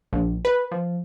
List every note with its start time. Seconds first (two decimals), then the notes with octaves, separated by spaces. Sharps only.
0.13 A#1
0.45 B4
0.72 F3